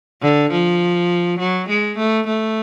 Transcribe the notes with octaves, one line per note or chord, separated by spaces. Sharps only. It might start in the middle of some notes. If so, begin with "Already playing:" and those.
D3
F3
F#3
G#3
A3
A3